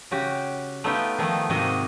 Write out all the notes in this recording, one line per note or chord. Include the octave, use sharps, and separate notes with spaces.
C#3 F#4 G4
A3 B3 D#4 F4 G4 G5
D#3 F3 A3 D#4
G#2 C3 D#3 A#3 F#4 D#5